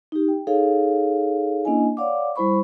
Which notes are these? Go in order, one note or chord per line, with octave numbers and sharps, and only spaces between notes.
D#4 G4
G5
D#4 G#4 A4 C#5 F5
A#3 C#4 D4 E4 D#5 G#5
C#5 D5 F5 F#5 D6
G3 E4 C5 B5 C#6